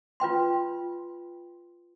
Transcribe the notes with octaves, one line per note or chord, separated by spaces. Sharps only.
F4 B4 G5 C6